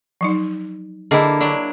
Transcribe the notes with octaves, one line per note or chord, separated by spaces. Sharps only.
F3 F#3 D#4
D3 A#3 E4 G#4 D#5 G5
F#3 D4 D5